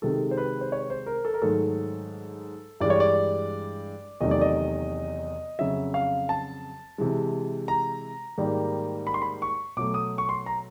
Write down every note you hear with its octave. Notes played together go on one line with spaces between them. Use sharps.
C3 D#3 G#3 A4
C5
B4
C5
C#5
C5
A#4
A4
A#4
G#2 D#3 F#3 A3 A4
G2 E3 G#3 D5
C#5
D5
E2 C3 D#3 F#3 A3 D#5
D5
D#5
F2 C#3 F#3 E5
F5
A5
C3 E3 G#3
A#5
G#2 D#3 G3 A#3
B5
C6
B5
C#6
B2 F#3 A3 D6
D#6
C#6
C6
A#5